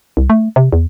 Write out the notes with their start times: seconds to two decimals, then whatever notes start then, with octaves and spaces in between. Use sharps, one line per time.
0.17 C2
0.30 A3
0.56 C3
0.73 E2